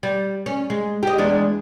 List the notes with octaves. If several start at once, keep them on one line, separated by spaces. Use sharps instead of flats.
G3
C#4
G#3
G4 D#5
E2 G#3 D4